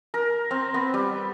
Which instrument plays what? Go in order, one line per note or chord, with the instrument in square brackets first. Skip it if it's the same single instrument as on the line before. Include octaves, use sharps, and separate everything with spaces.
[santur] A#4
C4
B3
G3